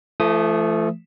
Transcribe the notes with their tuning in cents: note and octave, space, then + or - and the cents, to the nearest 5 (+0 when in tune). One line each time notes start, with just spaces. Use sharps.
F3 -45 A3 +0 D#6 +0